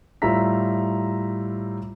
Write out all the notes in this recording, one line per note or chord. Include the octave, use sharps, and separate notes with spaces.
A2 G3 F4 E5 A#5 B6